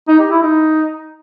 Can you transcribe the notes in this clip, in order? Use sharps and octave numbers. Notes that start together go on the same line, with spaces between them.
D#4
G4
E4
D#4